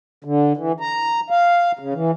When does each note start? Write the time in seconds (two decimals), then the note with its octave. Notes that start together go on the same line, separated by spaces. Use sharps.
0.24 D3
0.57 E3
0.80 A#5
1.30 F5
1.79 C#3
1.94 E3